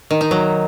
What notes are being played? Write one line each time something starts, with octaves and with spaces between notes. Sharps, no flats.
D#3
D#4
F#3